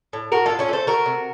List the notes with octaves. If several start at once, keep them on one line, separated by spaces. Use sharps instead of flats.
A2
A2 F#4 A#4
A2 F4 A4
C#4 F4
A3 A4 C5
A3 F#4 A#4
C3